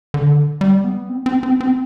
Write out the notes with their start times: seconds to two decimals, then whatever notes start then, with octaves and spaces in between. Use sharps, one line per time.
0.14 D3
0.61 G3
0.84 B3
1.09 C4
1.26 C4
1.43 C4
1.61 C4